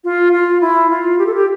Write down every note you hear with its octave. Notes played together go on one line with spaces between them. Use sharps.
F4
F4
E4
F4
G4
A4
G4